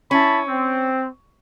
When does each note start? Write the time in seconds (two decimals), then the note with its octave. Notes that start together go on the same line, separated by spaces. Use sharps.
0.11 C#4 E4 A5 B5
0.48 C4